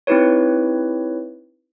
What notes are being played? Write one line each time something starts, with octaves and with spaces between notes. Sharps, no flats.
C4 D#4 E4 G4 B4 C#5